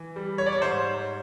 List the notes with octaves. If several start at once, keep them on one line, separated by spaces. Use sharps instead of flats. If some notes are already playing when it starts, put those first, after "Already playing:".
Already playing: E3
G3
C#5
D5
C#5
G#2 C5